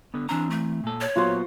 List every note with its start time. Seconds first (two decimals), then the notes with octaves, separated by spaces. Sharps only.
0.14 D3 B3
0.29 E3 C4 D4 A#5
0.50 A3
0.84 A#2 A4
1.01 C#5
1.15 A#2 F#3 B3 F4 F#4 C5